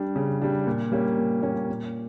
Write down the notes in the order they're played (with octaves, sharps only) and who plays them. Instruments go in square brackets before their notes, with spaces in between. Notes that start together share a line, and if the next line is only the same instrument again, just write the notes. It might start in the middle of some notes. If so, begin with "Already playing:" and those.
Already playing: [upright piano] G3 D4
C#3
G3 D4
A#2
G3 A#3 C#4
A#2
G3 A#3 C#4
A#2